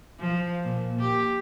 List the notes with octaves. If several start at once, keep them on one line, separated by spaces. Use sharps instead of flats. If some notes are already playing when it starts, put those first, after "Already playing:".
F3
A#2
G4